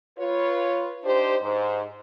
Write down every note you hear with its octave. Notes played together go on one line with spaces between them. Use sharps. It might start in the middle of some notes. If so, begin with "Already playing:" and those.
F4 B4 C#5
D4 D#4 G4 C5
G#2 C5